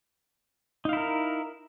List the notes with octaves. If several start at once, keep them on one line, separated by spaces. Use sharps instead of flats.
D#4 E4 A#4 F5